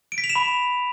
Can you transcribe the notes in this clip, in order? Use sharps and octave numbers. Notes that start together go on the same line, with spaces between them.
D7
B6
F7
E7
B5